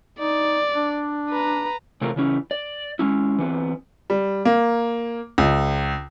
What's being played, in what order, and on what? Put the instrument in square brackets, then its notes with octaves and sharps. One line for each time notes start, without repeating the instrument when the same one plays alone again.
[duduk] D#4 [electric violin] D5
[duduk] D4
[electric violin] B4 A#5
[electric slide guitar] C3 E3 A3 C4 F4 A#4
C#3 E3 C#4 E4
D5
G#3 C#4 E4
E3 B3 C4
[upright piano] G3
A#3
C#2